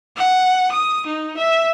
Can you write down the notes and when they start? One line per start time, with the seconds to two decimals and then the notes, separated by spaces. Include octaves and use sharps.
0.16 F#5
0.72 D#6
1.06 D#4
1.37 E5